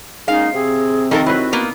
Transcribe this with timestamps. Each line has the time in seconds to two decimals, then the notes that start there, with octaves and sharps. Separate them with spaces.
0.28 G#3 A#3 C#4 D#4 F5
0.54 C3 C4 G#4
1.11 D#3 F3 A4 A#4
1.26 F#3 E4 F#4 B4
1.53 A#3 B3